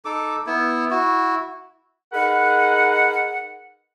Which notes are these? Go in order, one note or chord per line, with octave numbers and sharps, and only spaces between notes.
D#4 A4 D6
B3 E4
E4 F#4
D#4 G#4 A#4 B4 F#5